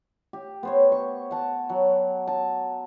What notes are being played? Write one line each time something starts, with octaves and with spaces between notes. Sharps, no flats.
G4
B3 C5 C#5
C#6
F#5 A5
F#3
A5